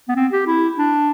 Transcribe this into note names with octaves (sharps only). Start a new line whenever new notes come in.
B3
C4
G4
E4
D4